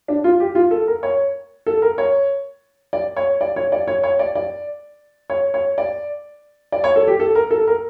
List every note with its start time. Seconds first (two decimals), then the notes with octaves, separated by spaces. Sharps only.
0.08 D4
0.24 F4
0.40 G4
0.55 F4
0.71 A4
0.87 A#4
1.03 C#5
1.66 A4
1.82 A#4
1.98 C#5
2.93 D5
3.17 C#5
3.41 D5
3.56 C#5
3.72 D5
3.88 C#5
4.04 C#5
4.19 D5
4.35 D5
5.30 C#5
5.54 C#5
5.78 D5
6.72 D5
6.84 C#5
6.96 A4
7.08 G4
7.20 A4
7.35 A#4
7.51 A4
7.67 A#4